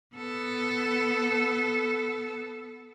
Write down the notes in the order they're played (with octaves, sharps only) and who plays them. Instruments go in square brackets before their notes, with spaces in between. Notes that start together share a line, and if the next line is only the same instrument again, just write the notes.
[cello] B3 A4